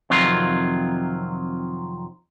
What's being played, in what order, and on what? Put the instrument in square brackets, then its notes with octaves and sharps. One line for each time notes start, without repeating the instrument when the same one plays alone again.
[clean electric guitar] F2 C3 D#3 F#3 F4